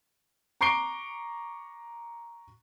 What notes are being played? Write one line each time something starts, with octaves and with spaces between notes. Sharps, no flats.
A#5 C#6 D6 C7 D7 G7